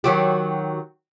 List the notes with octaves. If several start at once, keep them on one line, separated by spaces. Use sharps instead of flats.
D#3 F#3 G4